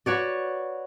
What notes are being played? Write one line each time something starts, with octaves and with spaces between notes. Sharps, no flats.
F#4 B4 C#5 D5